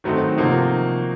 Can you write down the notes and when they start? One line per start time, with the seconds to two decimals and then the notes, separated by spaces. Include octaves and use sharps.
0.04 D#3 F#3 A3 C4 D#4
0.37 C3 F3 A#3 D#4 F#4